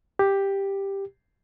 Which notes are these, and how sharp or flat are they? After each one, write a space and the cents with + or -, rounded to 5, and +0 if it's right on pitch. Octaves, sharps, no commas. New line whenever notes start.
G4 +5